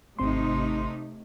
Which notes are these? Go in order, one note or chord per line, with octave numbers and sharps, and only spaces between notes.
G#1 C3 A3 C4 D#4 C6